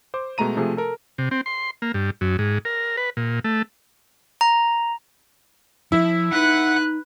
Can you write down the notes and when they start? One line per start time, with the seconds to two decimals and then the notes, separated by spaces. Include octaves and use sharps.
0.14 C5 D6
0.38 B2 G#3 A3 A#5 D#7
0.57 C3 F3 A3 G#4
0.77 A4 A#4
1.18 C3
1.31 C4
1.46 C6
1.82 A#3
1.94 G2
2.21 F#2
2.39 G#2
2.65 A#4
2.97 B4
3.17 A#2
3.44 A3
4.41 A#5
5.92 F3 E4
6.32 D#4 B4 F#5 F#6